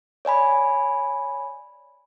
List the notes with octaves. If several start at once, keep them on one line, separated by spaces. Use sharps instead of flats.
C#5 D5 G#5 B5